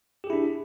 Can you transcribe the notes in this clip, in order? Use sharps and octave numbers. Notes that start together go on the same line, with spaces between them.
D4 E4 G4 G#4